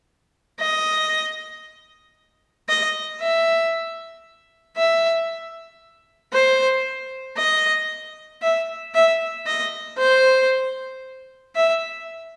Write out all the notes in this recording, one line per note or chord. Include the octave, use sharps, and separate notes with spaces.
D#5
D#5
E5
E5
C5
D#5
E5
E5
D#5
C5
E5